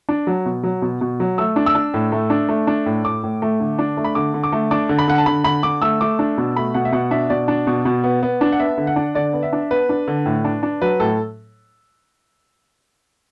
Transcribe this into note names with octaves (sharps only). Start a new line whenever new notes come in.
D4
F#3
B2
F#3
B2
B2
F#3
A3 E6
D4
E6
D4
A2
A3
D4
A3
D4
A2
A2 D6
A2
A3
D3
D4
A3
B5
D3 D6
D3
D6
A3
D4 D6
D3
B5
D3 F#5
A5
D3 B5
D3 B5
D3 D6
A3 E6
A3 D6
D4
B2
A3 B5
B2 F#5
E5
B2 F#5
D4 E5
B2 D5
D4
B2
B2
B3
B3
D4
F#5
B3 E5
D3
F#5
D4
D3 D5
B3
E5
D4
B3 B4
D4
D3
A2
D4
D4
F#3 B4
A2 A4